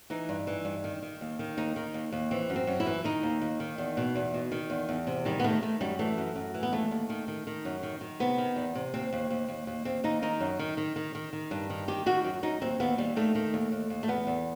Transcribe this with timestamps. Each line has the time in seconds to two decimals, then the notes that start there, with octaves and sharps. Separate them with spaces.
0.10 E3 D#4
0.29 G2
0.47 E3
0.65 G2
0.84 D#3
1.03 D#3
1.21 D#2
1.39 D#3
1.57 D#2 D#4
1.76 D#3
1.94 D#2
2.12 D#2
2.31 E3 C4
2.50 F#2
2.56 C4
2.67 F#2
2.80 E4
2.86 E3
3.04 D#3 D#4
3.23 D#2
3.42 D#2
3.60 D#3
3.78 E2
3.97 B2
4.16 E2
4.34 B2
4.52 D#3
4.70 E2
4.89 E2
5.07 C3
5.25 D#3 G3
5.40 B3
5.44 D#3 A3
5.62 D#3 A3
5.81 F#2 G3
5.99 E3 A3
6.18 F#2
6.36 F#2
6.54 E3
6.63 B3
6.72 D#2 A3
6.91 D#2
7.10 D#3
7.28 D#3
7.47 D#3
7.65 F#2
7.83 D#3
8.01 D#3
8.20 C3 B3
8.38 D#3
8.56 E2
8.75 C3
8.94 D#2 C4
9.12 D#2
9.31 D#2
9.48 D#2
9.67 D#2
9.85 D#2 C4
10.04 D#2 D#4
10.22 D#3 D#4
10.40 F#2
10.59 D#3
10.77 D#3
10.96 D#3
11.15 D#3
11.33 D#3
11.51 G2
11.70 D#3
11.88 D#3 G4
12.06 D#3 F#4
12.24 F#2
12.43 F#2 D#4
12.61 D#2 C4
12.80 D#2 B3
12.98 D#2 G3
13.16 D#3 A3
13.35 D#3
13.54 D#2
13.72 D#2
13.90 D#2
14.03 A3
14.08 E2 B3
14.27 E2